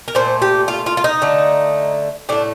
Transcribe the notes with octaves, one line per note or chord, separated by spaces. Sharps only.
A#4
A#2 A3 C5
G4
F4
F4
F4
D#4
D3 A3
A2 A3 D4